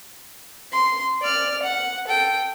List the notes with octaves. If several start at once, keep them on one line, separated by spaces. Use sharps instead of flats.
C6
D5 F6
F#5
A4 G5